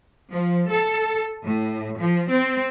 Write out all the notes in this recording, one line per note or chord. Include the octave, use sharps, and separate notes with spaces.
F3
A4
A2
F3
C4